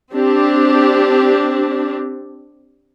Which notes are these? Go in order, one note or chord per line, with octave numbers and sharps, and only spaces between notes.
C4 D4 G4